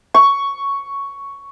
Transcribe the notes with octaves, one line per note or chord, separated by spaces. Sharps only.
C#6